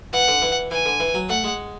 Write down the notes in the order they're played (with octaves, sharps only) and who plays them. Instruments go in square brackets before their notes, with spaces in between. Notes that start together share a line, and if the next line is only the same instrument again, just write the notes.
[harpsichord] E3 [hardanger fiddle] F#5
[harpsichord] D3
E3
[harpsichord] E3 [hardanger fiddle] G#5
[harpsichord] D3
E3
F#3
[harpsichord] A3 [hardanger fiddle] F#5
[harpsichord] G#3